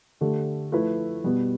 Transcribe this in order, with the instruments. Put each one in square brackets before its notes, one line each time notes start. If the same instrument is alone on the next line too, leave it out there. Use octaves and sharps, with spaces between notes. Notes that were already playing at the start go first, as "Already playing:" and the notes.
[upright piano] D3 A3 D4 G4
F3 A3 E4 B4
B2 G3 B3